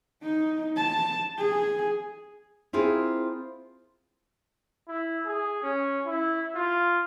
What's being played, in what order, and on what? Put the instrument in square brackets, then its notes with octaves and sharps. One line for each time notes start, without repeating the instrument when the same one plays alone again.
[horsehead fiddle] D#4
A5
G#4
[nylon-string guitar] C4 E4 F4 G#4 A#4
[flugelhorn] E4
G#4
C#4
E4
F4